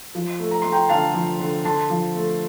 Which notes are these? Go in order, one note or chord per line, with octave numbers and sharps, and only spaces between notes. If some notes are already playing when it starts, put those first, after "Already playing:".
F3
A3
A#5
A3 C6
G5 A#5
D3 F5 A5
F3
D3
D3 A5 C6
F3
A3